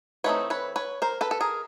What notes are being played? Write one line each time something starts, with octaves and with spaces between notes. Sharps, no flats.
E3 A3 C4 D#4 B4 C#5
B4 C#5
B4 C#5
A#4 C5
A4 B4
A4
G#4 A#4